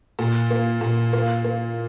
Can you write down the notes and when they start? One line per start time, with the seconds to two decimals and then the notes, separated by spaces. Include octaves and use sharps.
0.19 A#2
0.50 A#3
0.81 A#2
1.13 A#3
1.44 A#3